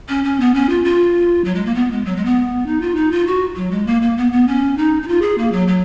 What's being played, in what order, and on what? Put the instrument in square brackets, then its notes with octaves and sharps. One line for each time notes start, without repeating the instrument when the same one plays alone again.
[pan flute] C#4
C#4
B3
C#4
F4
F4
F#3
G#3
A#3
B3
G#3
F#3
G#3
B3
D#4
F4
D#4
F4
F#4
F#3
G#3
A#3
A#3
B3
B3
C#4
D#4
D#4
F4
G#4
A#3
F#3
F#3